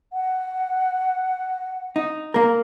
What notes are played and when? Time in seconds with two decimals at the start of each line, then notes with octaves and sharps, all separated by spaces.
0.13 F#5
1.96 D#4
2.34 A#3 A#4